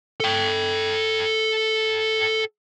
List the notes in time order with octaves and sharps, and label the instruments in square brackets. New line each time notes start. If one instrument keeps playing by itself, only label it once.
[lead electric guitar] A4 G5